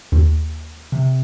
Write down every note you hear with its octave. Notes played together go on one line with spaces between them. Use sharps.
D#2
C3